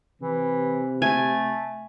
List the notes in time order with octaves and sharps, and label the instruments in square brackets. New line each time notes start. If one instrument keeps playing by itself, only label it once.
[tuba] C3 [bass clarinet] E3
[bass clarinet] A3 [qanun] G#5